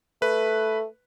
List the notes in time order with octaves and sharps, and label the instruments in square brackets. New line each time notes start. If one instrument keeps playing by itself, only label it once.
[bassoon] A3 [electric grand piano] B4